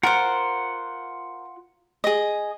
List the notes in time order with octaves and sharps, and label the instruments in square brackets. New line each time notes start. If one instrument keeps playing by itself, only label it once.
[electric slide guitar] F4 F#5 [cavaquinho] A#4 C5
[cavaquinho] G#4 D#5